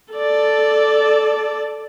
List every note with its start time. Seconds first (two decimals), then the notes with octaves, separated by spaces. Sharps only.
0.13 A4 D5